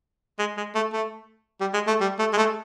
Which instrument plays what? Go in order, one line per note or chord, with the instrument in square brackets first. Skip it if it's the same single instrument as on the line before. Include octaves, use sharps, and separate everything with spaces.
[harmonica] G#3
G#3
A3
A3
G3
G#3
A3
G3
A3
G#3
A3